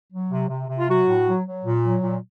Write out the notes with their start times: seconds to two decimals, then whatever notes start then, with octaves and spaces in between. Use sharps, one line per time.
0.11 F#3
0.31 C3
0.49 C3
0.68 C3
0.78 F4
0.88 F#3 F#4
1.07 A2
1.26 F#3
1.45 F#3
1.65 A#2
1.84 F#3
2.02 A#2